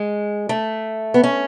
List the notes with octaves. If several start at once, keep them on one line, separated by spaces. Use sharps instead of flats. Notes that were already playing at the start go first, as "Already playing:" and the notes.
Already playing: G#3
A3
B3
C#4